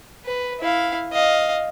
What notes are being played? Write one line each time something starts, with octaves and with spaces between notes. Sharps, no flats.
B4
E4 F5
D#5 F5